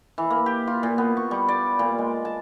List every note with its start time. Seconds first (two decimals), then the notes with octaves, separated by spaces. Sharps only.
0.18 E3
0.30 A#3
0.46 G4
0.67 F4
0.83 A#2
0.98 B3
1.17 C#6
1.31 G3
1.48 D5
1.79 A#2
1.98 G#3
2.25 A5